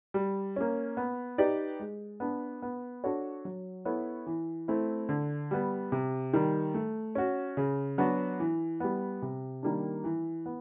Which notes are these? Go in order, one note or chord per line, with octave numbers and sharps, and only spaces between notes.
G3
A#3 C#4
B3
D#4 G4 B4 D5
G#3
B3 D4
B3
D4 F#4 A4 C#5
F#3
B3 E4 A4 C#5
E3
A3 C4 E4
D3
G3 B3
C3
D#3 G3
A3
C#4 F#4
C#3
F#3 B3 D4 F#4
E3
G3 B3
C3
D#3 G3 A#3 D4
E3
B3